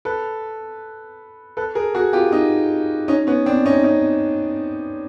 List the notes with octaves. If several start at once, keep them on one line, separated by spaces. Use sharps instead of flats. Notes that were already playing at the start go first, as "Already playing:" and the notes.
A4 B4
A4 B4
G#4 A#4
F#4 G#4
F4 G4
D#4 F4
C#4 D#4
B3 C#4
C4 D4
C#4 D#4
C#4 D#4